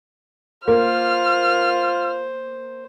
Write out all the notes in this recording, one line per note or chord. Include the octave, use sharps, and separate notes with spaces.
A#3 F4 C5 F6